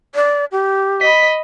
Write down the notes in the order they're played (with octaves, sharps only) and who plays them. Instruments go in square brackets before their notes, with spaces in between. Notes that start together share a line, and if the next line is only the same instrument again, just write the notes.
[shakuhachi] D5
G4
[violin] D#5 B5 [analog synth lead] B6